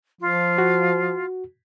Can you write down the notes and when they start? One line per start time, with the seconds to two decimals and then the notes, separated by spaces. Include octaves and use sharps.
0.21 F3 F4
0.58 F#4